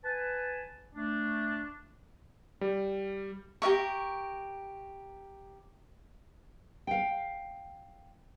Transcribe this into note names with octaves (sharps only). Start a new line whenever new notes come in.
B4 G#5 A5
A3 D4
G3
G4 A#4 E5 C#6
F5 G5